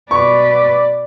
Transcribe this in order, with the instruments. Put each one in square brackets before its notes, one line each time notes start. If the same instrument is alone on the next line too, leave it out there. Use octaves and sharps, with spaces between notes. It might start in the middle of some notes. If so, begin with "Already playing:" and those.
[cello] B2 B4 [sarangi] D5 [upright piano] C#6